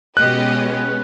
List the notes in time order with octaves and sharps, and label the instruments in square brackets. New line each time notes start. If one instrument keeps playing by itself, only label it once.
[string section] B2 G4 D#5 [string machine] G#3 B3 C#4 [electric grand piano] F#6